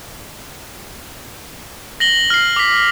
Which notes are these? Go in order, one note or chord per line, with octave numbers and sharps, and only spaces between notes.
A#6 F#7 G7
F6 C7
D6 B6